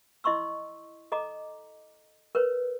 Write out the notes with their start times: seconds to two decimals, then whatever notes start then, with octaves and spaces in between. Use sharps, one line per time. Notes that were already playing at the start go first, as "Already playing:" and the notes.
0.24 E4 D#5 C6 C#6 E6
1.12 A4 D#5 A#5 D6
2.35 A#4 B4 C#5